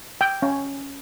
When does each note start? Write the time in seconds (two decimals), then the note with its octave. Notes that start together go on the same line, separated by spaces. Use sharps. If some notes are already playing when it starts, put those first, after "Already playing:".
0.21 G5
0.42 C#4